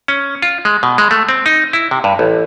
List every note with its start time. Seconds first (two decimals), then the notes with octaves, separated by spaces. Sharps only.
0.08 C#4
0.42 F4
0.65 G#3
0.83 B2
0.98 G#3
1.11 A3
1.29 C4
1.46 D#4
1.73 E4
1.91 C3
2.04 G2
2.19 A1